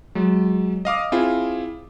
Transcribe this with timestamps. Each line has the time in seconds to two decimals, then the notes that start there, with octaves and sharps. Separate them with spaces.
0.15 F#3 G#3
0.85 D#5 F5 D6 D#6
1.12 C4 E4 F4 G#4